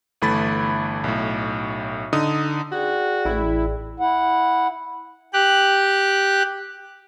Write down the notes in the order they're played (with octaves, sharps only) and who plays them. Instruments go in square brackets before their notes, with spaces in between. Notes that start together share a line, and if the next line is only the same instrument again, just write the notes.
[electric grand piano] G1 E3 A3 B5 A6
B1 A2
D3 D#4 D#6
[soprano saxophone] F#4 [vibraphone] G#4 D5 G5
[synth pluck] A1 [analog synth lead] E4
[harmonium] E4 F#5
[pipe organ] G4 F#6